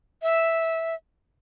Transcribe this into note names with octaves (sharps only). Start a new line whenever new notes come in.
E5